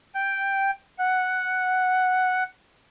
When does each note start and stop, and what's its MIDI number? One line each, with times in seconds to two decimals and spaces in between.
0.14 0.71 79
0.98 2.43 78